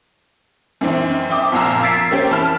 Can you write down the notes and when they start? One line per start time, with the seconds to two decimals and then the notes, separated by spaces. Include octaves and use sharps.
0.81 F#2 D#3 E3 C4
1.30 E5 G5 D6 D#6
1.52 F#1 A#2 F3 F5 A#5 E6
1.83 E6 G#6 A6 B6 C7 D7
2.11 A#3 C4 C#4 G4
2.30 F2 E3 A5 B5 F6